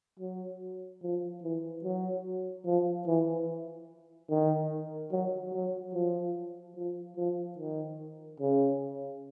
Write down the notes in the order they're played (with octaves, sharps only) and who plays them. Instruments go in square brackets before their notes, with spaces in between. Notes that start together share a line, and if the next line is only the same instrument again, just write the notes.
[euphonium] F#3
F3
E3
F#3
F3
E3
D#3
F#3
F#3
F3
F3
F3
D#3
C#3